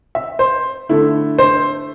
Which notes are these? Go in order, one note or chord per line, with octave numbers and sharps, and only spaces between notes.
E5
C5
D3 A3 E4
C5